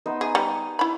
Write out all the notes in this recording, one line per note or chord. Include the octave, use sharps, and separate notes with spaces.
B3 D#4 C5
G#4 G#5 D#6
G3
E4 B5